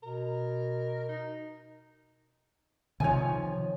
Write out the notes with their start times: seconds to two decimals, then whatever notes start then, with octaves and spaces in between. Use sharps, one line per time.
0.03 B2 A#4
1.09 D#4
3.00 C3 D#3 F3 C#5 G#5